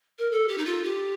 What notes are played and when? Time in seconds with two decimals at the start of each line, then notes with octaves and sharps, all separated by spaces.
0.18 A#4
0.31 A4
0.48 G4
0.58 D#4
0.65 F4
0.83 G4